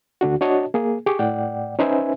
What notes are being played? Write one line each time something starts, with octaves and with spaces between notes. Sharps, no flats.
D2 D3 D4 F#4
D4 F#4 C#5 D#5 A5
A#3 G#4
G4 G#4 C#6 D6
A2 D5 F#5 G5
C#4 D#4 B4 C5 E5 G#5